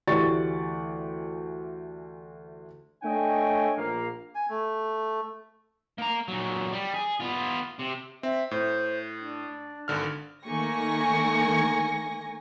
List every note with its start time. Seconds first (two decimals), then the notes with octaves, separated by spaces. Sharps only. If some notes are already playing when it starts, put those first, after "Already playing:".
0.07 D2 E3 G4 D5 C#6 A6
3.04 A3 D4 C#5 D#5 G5 G#5
3.77 A#1 A#3 F5
4.35 G#5
4.49 A3
5.98 A#3 A#5
6.28 A#2 F#3
6.72 G3
6.94 G#4
7.20 B3 F4
7.79 C3
8.23 C4 E5
8.51 A2 C5
9.20 D4
9.88 G#1 D3 F6
10.45 D#3 A3 A#3 G#5 C#6 A#6